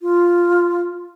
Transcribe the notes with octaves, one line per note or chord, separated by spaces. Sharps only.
F4